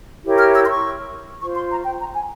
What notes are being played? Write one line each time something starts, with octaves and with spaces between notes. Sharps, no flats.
E4 G4 A#4 C#5
F6
E6
C6
C#6
F4 C5 C#6
C6
A#5
G5
A#5
G#5